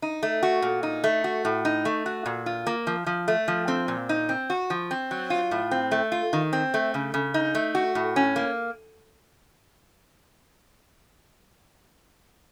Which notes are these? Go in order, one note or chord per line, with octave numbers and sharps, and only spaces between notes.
D#4
A3
F#4
A#2
D#4
A3
F#4
A2
D#4
A3
F#4
A#2
F4
A#3
F3
F3
A3
F3
C4
A#2
D#4
C4
F#4
F3
C4
F#3
F4
A2
C4
A3
F4
D#3
C4
A3
C#3
C#3
D#4
A3
F#4
A2
C#4
A#3